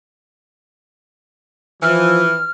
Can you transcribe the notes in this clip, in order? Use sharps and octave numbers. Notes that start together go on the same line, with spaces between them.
E3 F3 F6